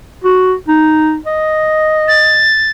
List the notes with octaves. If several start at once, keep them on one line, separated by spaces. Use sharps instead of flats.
F#4
D#4
D#5
A6